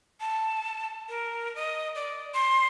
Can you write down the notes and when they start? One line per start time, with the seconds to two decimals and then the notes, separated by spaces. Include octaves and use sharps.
0.20 A5
1.09 A#4
1.55 D#5
1.95 D5
2.34 C6